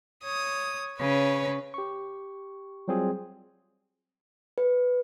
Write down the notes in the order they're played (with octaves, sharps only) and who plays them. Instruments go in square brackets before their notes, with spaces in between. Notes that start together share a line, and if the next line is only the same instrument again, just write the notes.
[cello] C#5 [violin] D#6
[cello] C#3 [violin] B4 C#5
[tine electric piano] G4 C#6
F#3 G3 C4 F4 G#4
[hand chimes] B4